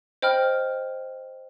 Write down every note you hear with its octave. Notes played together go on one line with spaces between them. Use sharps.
C5 D#5 G5 B5 F6